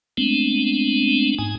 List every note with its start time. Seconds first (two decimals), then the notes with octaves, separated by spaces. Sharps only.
0.17 G#3 A3 B3 C4 D4
1.38 G#2 D#4 G#5